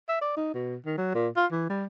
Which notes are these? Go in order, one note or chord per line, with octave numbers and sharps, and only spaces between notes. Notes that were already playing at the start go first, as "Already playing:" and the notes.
E5
D5
D#4
B2
D#3
F#3
A#2
F4
E3
G3